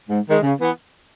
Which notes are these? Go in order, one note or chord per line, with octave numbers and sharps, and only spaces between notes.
G#2
D#3 G#3
C#3
E3 B3